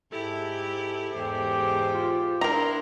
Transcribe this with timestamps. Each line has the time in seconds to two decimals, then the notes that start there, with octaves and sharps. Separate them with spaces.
0.12 G#2 E4 G4 A4
1.14 E2 G#2 G4 C5
1.94 F4
2.41 D4 E4 A#4 A#5 C6